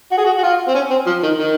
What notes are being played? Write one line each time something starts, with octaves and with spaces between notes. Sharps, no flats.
F#4
G#4
F#4
F#4
F4
C4
C#4
C4
F3
D#3
D#3